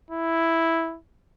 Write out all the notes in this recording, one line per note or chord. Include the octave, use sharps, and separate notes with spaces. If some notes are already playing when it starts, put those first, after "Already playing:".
E4